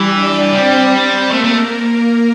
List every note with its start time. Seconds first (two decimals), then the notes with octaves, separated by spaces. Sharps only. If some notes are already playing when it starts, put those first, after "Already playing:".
Already playing: E3 G3 G4
0.13 D4 D5
0.52 G3 C4 C5
1.31 A3 A#3 A#4
1.44 A3